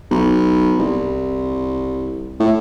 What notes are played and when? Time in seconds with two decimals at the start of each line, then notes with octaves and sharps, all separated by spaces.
0.11 B1
0.79 C2
2.40 A2